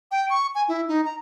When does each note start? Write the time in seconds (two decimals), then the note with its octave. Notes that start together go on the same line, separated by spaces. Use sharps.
0.11 G5
0.30 C#6
0.55 G#5
0.68 E4
0.88 D#4
1.05 A#5